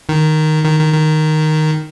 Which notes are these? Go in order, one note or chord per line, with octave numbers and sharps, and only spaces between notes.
D#3
D#3
D#3
D#3